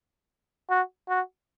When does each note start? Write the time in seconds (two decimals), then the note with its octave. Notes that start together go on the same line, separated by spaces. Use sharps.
0.70 F#4
1.09 F#4